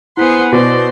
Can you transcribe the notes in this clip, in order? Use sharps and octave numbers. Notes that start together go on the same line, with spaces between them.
B3 E4 G#4 C5 F#5 B6
B2 C5 D5